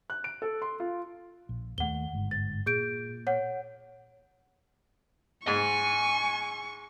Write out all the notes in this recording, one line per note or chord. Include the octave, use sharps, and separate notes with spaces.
F#6
D7
A4
C6
F4
A#1
D#2 A3 F#5 G7
G1 G#2
A6
A#2 G#4 G6 D7
C#5 F#5
G#2 G#5 C#6